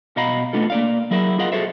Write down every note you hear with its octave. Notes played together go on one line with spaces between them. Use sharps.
B2 F#4 D#5 F5 A#5 B5
A3 B3 D4 F4 A4
A#3 D5 F5
F#3 E4 G#4 A#4 D#5 E5
F4 G#4 A#4 D#5 F5 F#5
F#4 G#4 A4 C5 E5